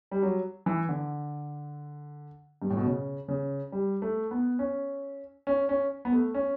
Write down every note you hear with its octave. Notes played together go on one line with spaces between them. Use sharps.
G3
F#3
E3
D3
G2
A2
B2
C#3
C#3
G3
A3
B3
C#4
C#4
C#4
B3
A3
C#4